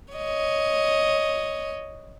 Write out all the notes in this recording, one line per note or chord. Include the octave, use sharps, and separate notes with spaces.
C#5 D#5